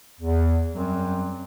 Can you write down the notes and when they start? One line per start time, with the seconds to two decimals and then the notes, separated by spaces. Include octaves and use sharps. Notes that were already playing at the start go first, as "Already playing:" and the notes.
0.21 E2
0.75 F#2 F#3 G3 C4